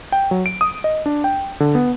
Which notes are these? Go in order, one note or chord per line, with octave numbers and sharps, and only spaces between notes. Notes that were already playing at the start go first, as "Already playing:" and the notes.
G5
F#3
D7
D#6
D#5
D4
G5
D3
B3